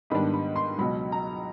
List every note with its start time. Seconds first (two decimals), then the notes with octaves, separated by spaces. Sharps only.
0.10 G#2 D#3 G3 B3 D4 B5
0.34 B5
0.56 C6
0.78 C#2 B2 F#3 B5
1.12 A#5